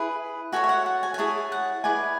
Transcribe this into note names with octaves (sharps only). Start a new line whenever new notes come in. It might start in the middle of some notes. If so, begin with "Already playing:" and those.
Already playing: E4 G#4 B4
F#4 A4 C#5 G#5
E5
F#5
F#5
G#5
G#5
E4 G#4 C#5 A5
F#5
E4 G#4 B4 D5 G#5